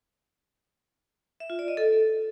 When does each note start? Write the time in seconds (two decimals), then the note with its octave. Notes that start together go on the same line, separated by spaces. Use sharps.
1.40 E5
1.50 F4
1.59 D5
1.68 D#5
1.77 A4